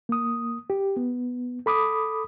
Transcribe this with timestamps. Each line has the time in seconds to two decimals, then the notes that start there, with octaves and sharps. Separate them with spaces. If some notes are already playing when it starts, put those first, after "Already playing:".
0.09 A#3 D#6
0.70 G4
0.96 B3
1.66 A4 B5 D6 D#6